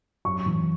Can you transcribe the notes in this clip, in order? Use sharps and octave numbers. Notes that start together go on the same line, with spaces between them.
F#2 C#6
E3